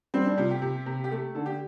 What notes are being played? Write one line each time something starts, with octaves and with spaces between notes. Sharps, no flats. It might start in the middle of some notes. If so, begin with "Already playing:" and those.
G3 C4
D4
C3 F4
G4
C3
C3
G4
A3 A4
D3 A4
G4